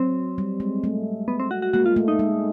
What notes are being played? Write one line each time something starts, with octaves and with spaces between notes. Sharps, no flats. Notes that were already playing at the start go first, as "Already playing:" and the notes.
Already playing: F#3 C4
G3
G#3
A3
B3
C4
F#4
F#4
G#3 A#3 F#4
F4
A3
D#4
G#3